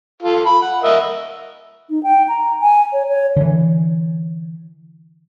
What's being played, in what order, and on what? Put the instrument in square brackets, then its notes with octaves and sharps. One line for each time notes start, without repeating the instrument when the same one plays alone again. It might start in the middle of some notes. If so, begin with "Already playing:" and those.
[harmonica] F4 A4
B5
F#5
A#4 D#5 E5
[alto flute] D#4
G5
A#5
G#5
C#5
C#5
[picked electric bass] D3 E3